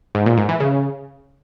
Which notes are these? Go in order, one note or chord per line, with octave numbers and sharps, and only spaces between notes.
G#2
A#2
G#2
E3
C#3